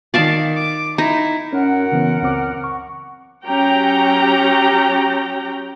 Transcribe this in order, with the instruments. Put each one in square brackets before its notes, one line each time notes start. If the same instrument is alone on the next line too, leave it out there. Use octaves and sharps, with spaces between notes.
[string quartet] D#3 [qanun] D5 F5 A5
[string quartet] D6
[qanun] D#4 [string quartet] E4
[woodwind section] F#2 A#4 F#5 [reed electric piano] C#4
[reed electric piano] C#3 E3 B3
C#2 C4 D6
C#6
[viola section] F#3 C#4 G4 G5 A#5